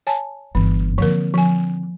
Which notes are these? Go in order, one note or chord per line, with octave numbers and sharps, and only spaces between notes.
C#5 G#5 A5
G1 E3
D3 F3 A#3 C4 A#4
F3 G#5